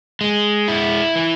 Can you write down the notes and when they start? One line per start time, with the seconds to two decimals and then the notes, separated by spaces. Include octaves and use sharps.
0.21 G#3
0.68 E4
1.16 E3